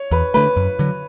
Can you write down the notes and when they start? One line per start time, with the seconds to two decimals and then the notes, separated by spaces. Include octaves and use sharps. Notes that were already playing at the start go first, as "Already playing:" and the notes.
Already playing: C#5
0.11 E2 B4
0.34 D3 A3 B4
0.57 F#2
0.79 D3 F#3